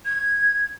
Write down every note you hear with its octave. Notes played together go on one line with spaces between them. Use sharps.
G#6